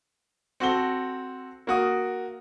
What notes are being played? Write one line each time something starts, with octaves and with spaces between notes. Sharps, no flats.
C4 F#4 A4 G7
A#3 F#4 D#6